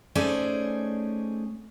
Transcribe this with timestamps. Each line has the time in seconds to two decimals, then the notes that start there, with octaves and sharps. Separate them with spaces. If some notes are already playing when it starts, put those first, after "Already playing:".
0.15 A3 C#4 D#4 G#4 C5 D5